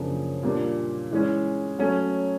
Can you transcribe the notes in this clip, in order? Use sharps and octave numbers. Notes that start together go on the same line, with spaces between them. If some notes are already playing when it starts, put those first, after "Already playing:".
Already playing: F#2 C#3 F3 A#3 D4
A#2 G3 A#3 D4
E3 G#3 C#4
F#3 A3 C#4